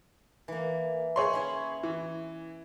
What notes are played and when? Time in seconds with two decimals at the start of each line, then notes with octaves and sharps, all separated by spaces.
0.48 E3 A#3
1.16 G#4 C#5 C6
1.33 C#4 E4
1.83 E3